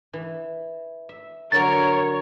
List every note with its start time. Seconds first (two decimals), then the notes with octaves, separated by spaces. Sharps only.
0.13 E3
1.09 E5
1.52 D3 F#3 A#4 C#5 A6